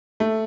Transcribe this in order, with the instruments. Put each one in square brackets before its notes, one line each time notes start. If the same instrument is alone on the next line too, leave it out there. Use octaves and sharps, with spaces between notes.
[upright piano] A3